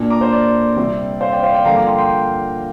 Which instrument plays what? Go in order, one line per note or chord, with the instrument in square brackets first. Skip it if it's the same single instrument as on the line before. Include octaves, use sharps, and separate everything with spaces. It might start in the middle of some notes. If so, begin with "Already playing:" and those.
Already playing: [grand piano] A#2 A#3 D4
A#5 D6
C5
D5
C3 G3 C4
C5 F5
D5 G5
C5 F5
D5 G5
G2 D3 F3 A#3 F5 A#5
A#5 D6
G5 C6
G5 C6